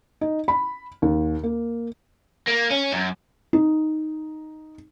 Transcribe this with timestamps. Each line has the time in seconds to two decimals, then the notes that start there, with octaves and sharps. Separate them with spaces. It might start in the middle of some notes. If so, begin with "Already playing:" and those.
0.21 D#4
0.48 B5
1.02 D#2
1.44 A#3
2.48 A#3
2.71 C#4
2.92 F#2
3.53 D#4